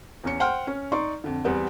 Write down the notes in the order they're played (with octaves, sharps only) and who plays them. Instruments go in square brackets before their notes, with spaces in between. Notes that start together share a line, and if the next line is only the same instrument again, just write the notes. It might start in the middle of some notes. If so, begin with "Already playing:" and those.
[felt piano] E2 C#4 C#7
C5 F#5 G5 C6 F6
C#4
D#4 D5 C6 C#6
F2 D3
E2 G3 B3 C4